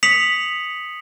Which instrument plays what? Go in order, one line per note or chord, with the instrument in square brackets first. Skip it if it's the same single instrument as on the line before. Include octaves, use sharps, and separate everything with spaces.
[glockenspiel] D#6 B6 C#7 F7 F#7